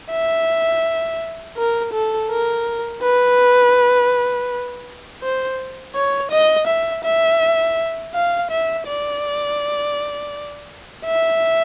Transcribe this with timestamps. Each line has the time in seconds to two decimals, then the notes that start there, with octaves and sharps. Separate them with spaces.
0.10 E5
1.57 A#4
1.93 A4
2.30 A#4
3.03 B4
5.22 C5
5.95 C#5
6.32 D#5
6.67 E5
7.04 E5
8.14 F5
8.51 E5
8.88 D5
11.06 E5